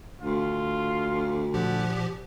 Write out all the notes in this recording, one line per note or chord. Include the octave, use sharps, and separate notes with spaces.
D2 F4
A#2 F3 G4 F#5